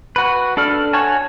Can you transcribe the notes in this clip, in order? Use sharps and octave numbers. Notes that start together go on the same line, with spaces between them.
F#4 B4
D4 A4 D5 F6
F#4 C#5 G#5 A5